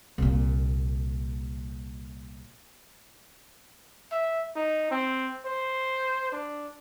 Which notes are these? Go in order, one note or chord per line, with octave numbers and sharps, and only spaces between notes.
C2 A#2
E5
D#4
C4
C5
D4